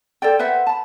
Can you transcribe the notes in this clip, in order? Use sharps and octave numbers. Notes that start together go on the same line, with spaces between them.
A4 C5 D5 G5
B4 C5 E5 F#5
A5 B5